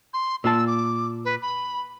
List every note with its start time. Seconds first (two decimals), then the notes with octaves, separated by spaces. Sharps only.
0.14 C6
0.44 A#2 F4 A5 E6
0.67 D6
1.25 B4
1.42 B5